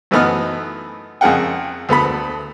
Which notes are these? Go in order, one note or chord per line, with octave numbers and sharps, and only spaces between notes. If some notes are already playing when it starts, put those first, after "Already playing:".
F#2 E3 A3 B3 D#4 F6
F2 C#3 G#4 A#4 F#5 G5
D2 B3 A4 B5